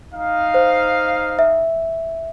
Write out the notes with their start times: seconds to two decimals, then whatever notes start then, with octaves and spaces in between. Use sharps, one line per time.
0.12 D#4 F5
0.54 C5
1.39 E5